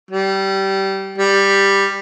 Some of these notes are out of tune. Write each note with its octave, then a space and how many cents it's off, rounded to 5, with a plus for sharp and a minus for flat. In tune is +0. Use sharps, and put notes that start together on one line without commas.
G3 -20
G3 +10